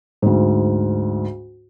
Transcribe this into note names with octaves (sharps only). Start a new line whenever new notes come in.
D2 G#2